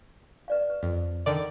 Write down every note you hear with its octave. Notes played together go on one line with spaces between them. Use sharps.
B4 D5 F5
B4
F2
D3 D#3 D5